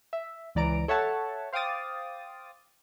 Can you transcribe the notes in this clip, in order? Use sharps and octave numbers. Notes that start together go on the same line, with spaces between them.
E5
C#2 E3 D5 A#5 D7
A4 C#5 E5 F#5 A5
C5 F5 G5 D6 D#6 A6